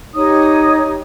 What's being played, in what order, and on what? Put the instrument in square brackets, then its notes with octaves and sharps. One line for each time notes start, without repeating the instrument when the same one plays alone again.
[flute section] D#4 G4 C#5 D#6